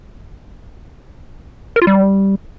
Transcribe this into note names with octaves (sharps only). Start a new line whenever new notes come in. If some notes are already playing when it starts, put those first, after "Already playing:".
A#4
F4
G3